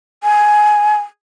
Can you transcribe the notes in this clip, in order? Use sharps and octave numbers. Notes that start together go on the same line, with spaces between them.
G#5